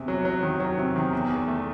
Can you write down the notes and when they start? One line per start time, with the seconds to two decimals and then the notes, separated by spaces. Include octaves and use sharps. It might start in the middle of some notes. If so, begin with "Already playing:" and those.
Already playing: E2 C3
0.08 F#3
0.25 F#3
0.43 D#3
0.60 F#3
0.78 C3
0.96 D#3
1.13 E2
1.30 E2
1.48 A3